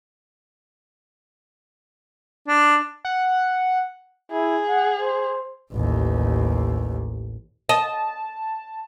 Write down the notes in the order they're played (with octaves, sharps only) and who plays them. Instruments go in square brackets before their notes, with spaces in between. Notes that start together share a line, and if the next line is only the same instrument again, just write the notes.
[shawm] D4
[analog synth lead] F#5
[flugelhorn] E4 [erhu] G#4
[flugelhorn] F#5
C5
[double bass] A1 D#2
[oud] D#5 [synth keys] A5